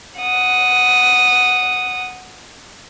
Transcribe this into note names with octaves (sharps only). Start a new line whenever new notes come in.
F#5 D#6